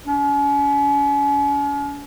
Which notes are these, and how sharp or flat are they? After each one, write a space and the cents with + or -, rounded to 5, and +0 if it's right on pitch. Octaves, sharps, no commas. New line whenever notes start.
C#4 +40